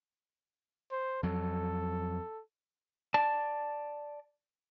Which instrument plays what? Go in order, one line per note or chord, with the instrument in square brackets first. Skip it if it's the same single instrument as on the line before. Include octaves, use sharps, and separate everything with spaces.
[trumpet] C5
[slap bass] F2 F#3 [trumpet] A4
[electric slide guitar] D5 A5